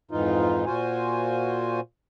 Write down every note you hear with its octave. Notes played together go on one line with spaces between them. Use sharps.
F2 G#2 E3 D#4 F4
A#2 F4 F#4 C5 G#5